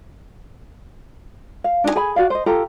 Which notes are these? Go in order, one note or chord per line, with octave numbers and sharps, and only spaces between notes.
F5
D4 D#4 G4 G#5
G#4 G#5 B5
F#4 D5 F5
C5 D#5
F4 G4 A4 A#5